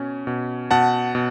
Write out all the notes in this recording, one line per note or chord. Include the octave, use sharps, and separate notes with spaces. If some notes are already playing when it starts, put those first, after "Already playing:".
Already playing: B2 C#4
B2
B2 F#5 A5
B2